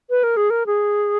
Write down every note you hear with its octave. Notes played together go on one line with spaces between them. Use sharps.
B4
A#4
G#4
A#4
G#4